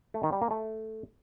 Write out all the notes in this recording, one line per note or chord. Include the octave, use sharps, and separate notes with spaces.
A3
D#3
G3
A#3
A3